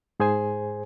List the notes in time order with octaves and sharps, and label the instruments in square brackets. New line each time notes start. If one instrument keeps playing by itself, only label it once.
[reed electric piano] G#2 G#4 C5 G#5